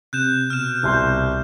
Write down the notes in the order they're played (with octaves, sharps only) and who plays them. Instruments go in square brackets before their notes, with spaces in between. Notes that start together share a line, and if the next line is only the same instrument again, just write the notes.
[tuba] C3 [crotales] F#6 G6 E7
[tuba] B2 [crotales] F6 E7
[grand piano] C2 C6 G6